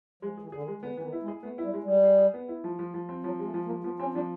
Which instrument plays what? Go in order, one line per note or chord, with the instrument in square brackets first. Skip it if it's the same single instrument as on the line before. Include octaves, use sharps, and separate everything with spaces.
[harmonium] F3 [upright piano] G#3
[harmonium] E3 [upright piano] G#4
[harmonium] D3 [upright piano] G#4
[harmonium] D#3
[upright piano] G#3
[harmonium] D3 [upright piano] B3
[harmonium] E3 [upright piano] B3
[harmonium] D#3
[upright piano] E4
[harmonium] G#3
[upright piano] G#4
[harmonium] A3 [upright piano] B3
[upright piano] E4
[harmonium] G3
[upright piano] G#3
[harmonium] G3 [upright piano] G#4
[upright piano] G#4
G#4
B3
E4
F3
F3
F3
C4
[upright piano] F3 [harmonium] F#3
[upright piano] G#3 [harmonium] A3
[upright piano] F3
[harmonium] A#3
[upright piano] F3
[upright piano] F3 [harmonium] B3
[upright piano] C4 [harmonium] C#4
[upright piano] F3 [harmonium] D4